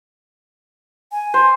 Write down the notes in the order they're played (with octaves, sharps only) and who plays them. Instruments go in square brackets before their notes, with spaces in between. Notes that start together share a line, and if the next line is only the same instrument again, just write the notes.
[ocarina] G#5
[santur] C5